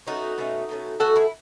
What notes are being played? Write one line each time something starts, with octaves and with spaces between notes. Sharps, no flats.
B2 A3 C#4 D#4 F#4
B2 A3 C#4
B2 A3 C#4
B2 A3 C#4 F#4 A4
E4 G#4